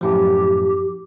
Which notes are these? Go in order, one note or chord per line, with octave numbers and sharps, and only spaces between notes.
F#2 A2 F3 G4